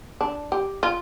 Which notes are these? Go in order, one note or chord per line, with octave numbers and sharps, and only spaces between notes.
D4
G4
F4